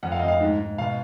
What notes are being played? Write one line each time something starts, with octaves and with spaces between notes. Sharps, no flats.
F2 F#5
F5
F2 D#5
F5
G#2
G#2
B2 F5